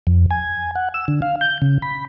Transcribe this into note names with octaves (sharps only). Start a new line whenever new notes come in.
F2
G#5
F#5
E6
D3
F5
G6
C#3
B5